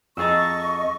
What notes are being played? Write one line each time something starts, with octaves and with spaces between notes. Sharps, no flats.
F2 G#4 D#5 A#5 C#6 E6 A6